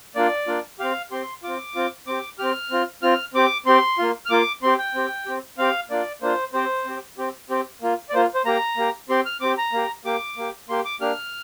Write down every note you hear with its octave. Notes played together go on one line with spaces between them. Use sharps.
A#3 D4 F4 D5
A#3 D4 F4
C4 G4 F5
C4 G4 C6
C4 F4 D6
C4 F4
C4 G4 D6
C4 G4 F6
C4 F4
C4 F4 F6
C4 G4 D6
C4 G4 C6
A#3 F4
F6
A#3 F4 D6
C4 G4 C6
G5
C4 G4
C4 G4
C4 G4 F5
A#3 D4 F4 D5
A#3 D4 F4 C5
C4 G4 C5
C4 G4
C4 G4
C4 G4
A#3 F4
D5
A#3 F4 C5
C5
A#3 G4 A#5
A#3 G4
C4 G4 C6
F6
C4 G4 D6
A#5
A#3 G4
A#3 G4 D6
A#3 G4
A#3 G4 C6
D6
A#3 D4 G4 F6